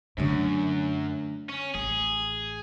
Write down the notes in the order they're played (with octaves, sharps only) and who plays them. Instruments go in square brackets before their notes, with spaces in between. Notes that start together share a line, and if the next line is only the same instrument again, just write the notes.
[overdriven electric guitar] F#2 [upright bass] D3 A3
[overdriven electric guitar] C#4
[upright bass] A1 [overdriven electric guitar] G#4